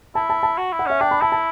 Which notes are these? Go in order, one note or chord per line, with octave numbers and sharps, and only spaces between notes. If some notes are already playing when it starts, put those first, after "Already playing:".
E4 A5
A5
A5
F#4
E4
F#5
C#4 E5
D4 G5
B5
E4 A5
A5